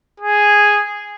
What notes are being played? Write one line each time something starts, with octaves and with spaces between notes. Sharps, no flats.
G#4